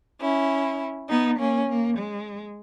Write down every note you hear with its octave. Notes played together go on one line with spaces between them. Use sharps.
C#4 E4
B3 D#4
A#3 C#4
A#3
G#3